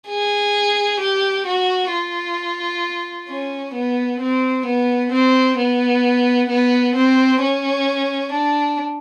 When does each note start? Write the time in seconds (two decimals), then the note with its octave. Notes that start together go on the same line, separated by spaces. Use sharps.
0.08 G#4
1.00 G4
1.47 F#4
1.92 F4
3.29 C#4
3.74 B3
4.20 C4
4.66 B3
5.12 C4
5.58 B3
6.49 B3
6.96 C4
7.41 C#4
8.32 D4